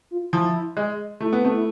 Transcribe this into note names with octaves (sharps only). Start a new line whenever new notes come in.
F4
F3 E4
G#3
A3 E4
B3
C4
A3
E4